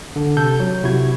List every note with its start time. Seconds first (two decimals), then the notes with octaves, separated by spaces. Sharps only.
0.16 D3
0.37 C3 A4 G6
0.60 F#3
0.83 C3 E4 F#4 G#6